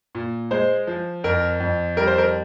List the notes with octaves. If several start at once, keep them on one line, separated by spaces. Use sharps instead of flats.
A#2
G#3 C5
F3
F2 A#4
F2
G3 A#4
C5
A#4